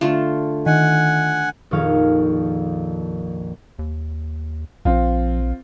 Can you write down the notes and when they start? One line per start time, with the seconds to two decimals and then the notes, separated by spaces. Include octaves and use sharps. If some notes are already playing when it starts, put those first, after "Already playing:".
0.01 D3 A3 F4
0.66 D#3 F#5 G#5
1.71 A#1 F2 D#3 C#5 F5 G#6
3.79 D#2
4.85 A#1 F3 C4 F4